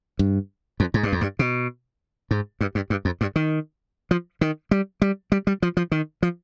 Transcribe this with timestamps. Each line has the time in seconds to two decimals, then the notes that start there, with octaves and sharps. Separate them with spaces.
0.19 G2
0.80 F2
0.94 G#2
1.03 G2
1.13 F2
1.21 G2
1.39 B2
2.31 G#2
2.61 G2
2.75 G2
2.90 G2
3.05 F2
3.21 G2
3.36 D#3
4.11 F3
4.41 D#3
4.71 G3
5.02 G3
5.32 G3
5.47 G3
5.62 F3
5.77 F3
5.92 D#3
6.22 F3